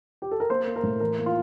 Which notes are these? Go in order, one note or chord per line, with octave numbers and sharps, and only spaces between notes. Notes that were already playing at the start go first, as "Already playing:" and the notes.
G4
A4
A#4
A#3 C5
A#3
A#4
A2
E3 A#4
A#3
F4